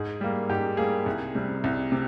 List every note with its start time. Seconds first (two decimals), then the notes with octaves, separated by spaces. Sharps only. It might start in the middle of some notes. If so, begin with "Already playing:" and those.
Already playing: G#2 G#4
0.21 G3 A#3
0.49 G#2 G4
0.77 G3 A#3 G#4
1.06 C2
1.35 C3 G3
1.64 C2
1.92 C3